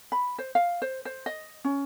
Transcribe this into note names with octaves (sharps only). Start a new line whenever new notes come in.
B5
C5
F5
C5
C5
D#5
C#4